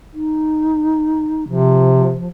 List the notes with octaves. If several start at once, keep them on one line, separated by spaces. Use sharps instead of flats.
D#4
C3 F3